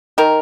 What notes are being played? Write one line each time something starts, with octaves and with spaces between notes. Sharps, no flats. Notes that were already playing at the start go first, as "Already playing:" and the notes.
D#3 A#4